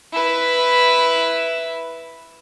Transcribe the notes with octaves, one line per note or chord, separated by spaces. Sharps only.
E4 B4